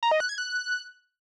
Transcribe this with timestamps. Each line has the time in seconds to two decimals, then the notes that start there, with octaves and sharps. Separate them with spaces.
0.03 A#5
0.11 D#5
0.20 F#6
0.29 G#6
0.38 F#6